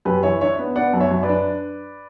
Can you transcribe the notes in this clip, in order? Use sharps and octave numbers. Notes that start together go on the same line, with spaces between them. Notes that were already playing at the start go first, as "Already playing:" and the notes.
F#2 G4 B4
E3 C#5 E5
D4 C#5 E5
B3
B3 D5 F#5
F#2
C#5 E5
F#2
B4 D5
D4